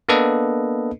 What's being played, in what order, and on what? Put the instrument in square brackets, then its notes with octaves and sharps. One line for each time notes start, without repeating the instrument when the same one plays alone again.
[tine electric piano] A#3 B3 D4 A4 B4 D#5